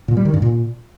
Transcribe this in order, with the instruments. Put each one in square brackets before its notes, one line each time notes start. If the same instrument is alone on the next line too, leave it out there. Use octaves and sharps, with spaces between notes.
[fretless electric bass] A#2
G3
D#3
G2
A#2